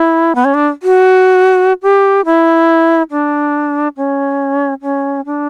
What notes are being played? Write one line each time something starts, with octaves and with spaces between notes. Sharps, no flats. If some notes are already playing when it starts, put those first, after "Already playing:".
Already playing: E4
B3
C#4
D4
F#4
G4
E4
D4
C#4
C#4
D4